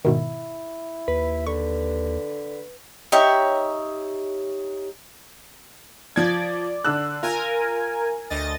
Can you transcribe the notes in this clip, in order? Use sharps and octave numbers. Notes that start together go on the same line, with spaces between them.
G#2 B2 D#3 E4
D#2 B4
D3 C#6
D#4 G4 C#5 E5
F3 D5 G#6
D3 E6 F#6
F4 A#4 G#5
D2 D#5 A6